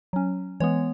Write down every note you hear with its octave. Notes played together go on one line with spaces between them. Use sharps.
F#3 C#4
E3 G#3 B3 C#5